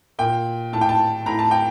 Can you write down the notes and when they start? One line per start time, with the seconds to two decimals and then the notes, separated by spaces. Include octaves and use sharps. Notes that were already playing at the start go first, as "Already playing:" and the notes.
0.19 A#2 G5
0.73 A2 A5
0.81 G5
0.89 A5
1.26 A2 A#5
1.39 A5
1.51 G5